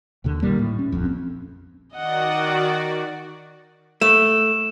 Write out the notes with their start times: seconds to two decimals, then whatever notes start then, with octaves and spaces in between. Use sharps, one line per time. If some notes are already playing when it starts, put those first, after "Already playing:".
0.24 D#2 B2 D3
0.42 A1 D#3 G3 A#3
0.59 A2
0.79 C#4
0.92 D#1 A#1 F2
1.05 C4
1.94 D#3 F#4 D5 D#5 F#5
4.01 A3 E7